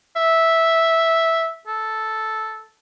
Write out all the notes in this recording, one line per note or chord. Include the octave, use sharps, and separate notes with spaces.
E5
A4